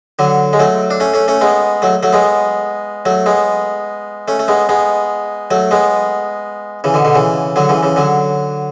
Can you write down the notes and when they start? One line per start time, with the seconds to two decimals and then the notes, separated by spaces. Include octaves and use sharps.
0.19 D3 F#3
0.53 G#3
0.59 F#3 A3
0.91 D4
1.00 A3 C#4
1.14 A3 C#4
1.28 A3 C#4
1.41 G#3 B3
1.82 F#3 A3
2.03 F#3 A3
2.13 G#3 B3
3.05 F#3 A3
3.26 G#3 B3
4.28 A3 C#4
4.39 A3
4.48 G#3 B3
4.69 G#3 B3
5.51 F#3 A3
5.71 G#3 B3
6.84 C#3 E3
6.94 B2 D3
7.05 B2 D3
7.15 C#3 E3
7.56 D3 F#3
7.69 C#3 E3
7.83 C#3 E3
7.96 D3 F#3